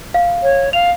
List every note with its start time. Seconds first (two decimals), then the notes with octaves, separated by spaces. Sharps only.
0.14 F5
0.43 C#5
0.73 F5 F7